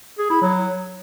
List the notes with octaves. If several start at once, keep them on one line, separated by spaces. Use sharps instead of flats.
G#4
E4
F#3